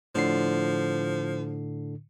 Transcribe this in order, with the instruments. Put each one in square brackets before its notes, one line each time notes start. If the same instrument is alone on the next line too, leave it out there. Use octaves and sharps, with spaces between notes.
[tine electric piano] A2 D3 C7 [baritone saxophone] F3